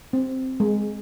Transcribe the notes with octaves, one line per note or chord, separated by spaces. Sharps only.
C4
G#3